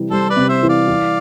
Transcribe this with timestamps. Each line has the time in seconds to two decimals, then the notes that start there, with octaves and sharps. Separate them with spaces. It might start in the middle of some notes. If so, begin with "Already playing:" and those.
Already playing: C3 E3 G3
0.10 G3 A4 C5
0.30 B4 D5
0.36 C3
0.49 C5 E5
0.63 E3
0.69 D5 F5
0.88 E3